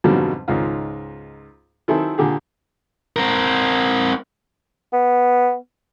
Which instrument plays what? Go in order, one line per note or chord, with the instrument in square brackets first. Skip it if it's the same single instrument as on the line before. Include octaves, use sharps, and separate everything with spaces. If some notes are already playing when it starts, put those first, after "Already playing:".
[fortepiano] F2 G#2 B2 D3 F#3 G3
C#2 G#2 D#3 F4
D#3 F#3 C4 E4 G#4 A4
A#2 D3 G4 G#4
[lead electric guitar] C4 A#4
[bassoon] B3